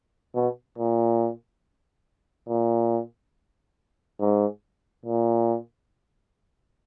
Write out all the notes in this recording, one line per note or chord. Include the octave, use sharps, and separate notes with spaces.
B2
A#2
A#2
G#2
A#2